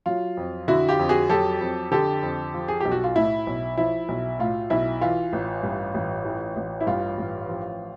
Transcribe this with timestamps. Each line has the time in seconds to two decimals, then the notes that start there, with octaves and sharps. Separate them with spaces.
0.06 F#3 F4
0.37 F2
0.68 D3 E4 F#4
0.89 F4 G4
0.99 F2
1.09 F#4 G#4
1.30 F#3 G4 A4
1.61 F2
1.91 D3 G4 A4
2.23 F2
2.54 F3
2.68 G#4
2.81 B1 G4
2.92 F#4
3.04 F4
3.16 A2 E4
3.47 B1
3.77 F3 E4
4.08 B1
4.39 A2 F4
4.70 B1 E4
5.01 E3 F4
5.33 A1
5.63 G2
5.94 A1
6.25 E3
6.56 A1
6.81 E4
6.87 G2 F4
7.18 A1
7.49 F3